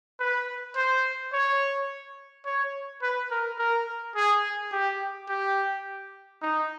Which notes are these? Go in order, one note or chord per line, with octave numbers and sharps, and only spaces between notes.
B4
C5
C#5
C#5
B4
A#4
A#4
G#4
G4
G4
D#4